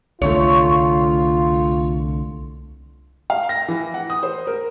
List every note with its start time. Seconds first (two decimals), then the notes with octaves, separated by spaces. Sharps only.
0.22 C2 D3 A3 F4 C#5
3.30 F5
3.49 A#6
3.68 E3
3.94 F#5
4.10 D#6
4.23 C5
4.47 A#4